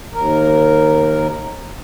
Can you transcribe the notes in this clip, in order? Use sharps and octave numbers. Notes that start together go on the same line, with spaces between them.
D#2 A#4